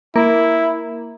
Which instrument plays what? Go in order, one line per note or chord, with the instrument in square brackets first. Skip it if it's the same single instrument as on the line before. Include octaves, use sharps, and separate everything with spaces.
[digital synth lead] A#3 [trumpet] E4